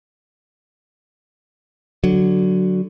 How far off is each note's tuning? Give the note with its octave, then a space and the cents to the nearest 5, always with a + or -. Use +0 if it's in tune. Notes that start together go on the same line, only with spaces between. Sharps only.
D3 +0 F#3 +0